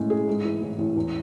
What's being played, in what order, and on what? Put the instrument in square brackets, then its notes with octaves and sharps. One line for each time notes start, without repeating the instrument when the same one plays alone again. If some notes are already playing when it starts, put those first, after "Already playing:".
Already playing: [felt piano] A2 G#3 C#4
G#4
G#2
E3
A1
A1
E2